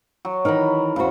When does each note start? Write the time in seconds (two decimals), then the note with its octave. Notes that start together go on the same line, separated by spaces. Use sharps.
0.25 F#3
0.45 D#3 E3 D#4 A#4 B5
0.96 E2 C#3 F#4 C5